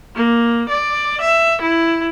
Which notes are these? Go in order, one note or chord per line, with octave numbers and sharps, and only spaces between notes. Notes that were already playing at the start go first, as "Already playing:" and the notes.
A#3
D5
E5
E4